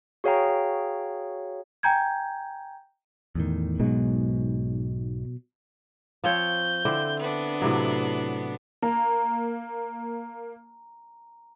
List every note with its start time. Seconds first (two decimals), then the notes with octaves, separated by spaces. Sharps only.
0.24 F#4 G#4 C#5 F5 G5 A#5
1.83 G5 G#5 A#5 G6 G#6
3.35 E2 A2 D#3
3.80 B1 G#2 B2 F#3 G#3
6.24 F3 C4 C#5 G6
6.85 D3 C4 E4
7.20 B3 D4
7.62 A2 C3 F#3
8.82 A#3 A#5